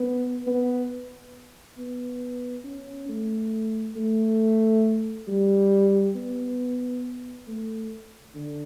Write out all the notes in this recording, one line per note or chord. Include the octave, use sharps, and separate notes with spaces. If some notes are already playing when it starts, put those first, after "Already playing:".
Already playing: B3
B3
B3
C#4
A3
A3
G3
B3
A3
D3